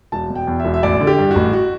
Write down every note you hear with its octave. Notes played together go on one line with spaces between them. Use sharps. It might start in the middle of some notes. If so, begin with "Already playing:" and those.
E1 A5
B2
G5
E2
E1 E5
E5
A1 D5
D3
G4
G2
A1 F#4
F#4